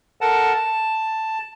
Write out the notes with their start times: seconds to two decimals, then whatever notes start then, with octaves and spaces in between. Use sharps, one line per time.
0.21 A4 A#4 F#5 A5
0.54 A5